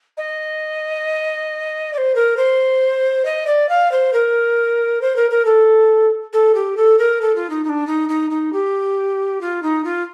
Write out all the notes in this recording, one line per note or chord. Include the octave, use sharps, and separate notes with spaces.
D#5
D5
C5
A#4
C5
D#5
D5
F5
C5
A#4
C5
A#4
A#4
A4
A4
G4
A4
A#4
A4
F4
D#4
D#4
D4
D#4
D#4
D#4
G4
F4
D#4
F4